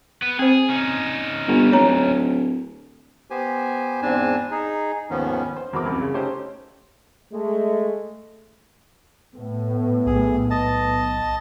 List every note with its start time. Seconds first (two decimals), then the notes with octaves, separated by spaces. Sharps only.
0.22 B3 B4
0.39 C4 G#4 C5
0.69 C#4 D#4
1.48 G1
1.72 D1 C#5 A#5
3.30 B3 G4 C5 G#5
4.02 E2 G#2 C4 D4 G#5 A5
4.51 D#4 G#4
5.10 D#2 G#2 D#3 F3 B3 C#4
5.56 C5
5.73 E2 F#4 A#4 B5 D6
5.85 C2 F#2
6.01 C#3
6.14 A3 C#4 D#4 G4 C5
7.32 G#3 A3
9.35 A2 B3
10.07 B1 G#4
10.50 D#5 A5